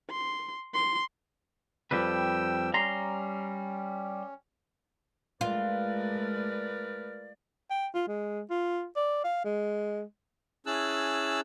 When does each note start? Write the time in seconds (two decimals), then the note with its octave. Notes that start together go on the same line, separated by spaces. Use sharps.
0.11 C6
0.74 C6
1.91 F2 G3 B4 G5 E6
2.74 G3 C#4 A#5 C6
5.41 G#3 A3 F4 A#4 B4 D5
7.70 G5
7.95 F4
8.08 G#3
8.50 F4
8.96 D5
9.24 F5
9.45 G#3
10.66 C#4 E4 G#4 A5 E6 F#6